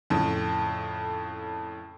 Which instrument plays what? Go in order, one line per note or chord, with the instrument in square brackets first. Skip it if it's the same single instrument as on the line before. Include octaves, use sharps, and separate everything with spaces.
[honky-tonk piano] F2 A2 C#3